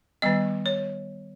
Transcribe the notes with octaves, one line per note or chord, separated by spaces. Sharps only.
D#3 G3 B3 D#5
C#5